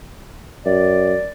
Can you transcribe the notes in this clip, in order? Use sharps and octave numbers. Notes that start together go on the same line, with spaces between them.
F#2 D5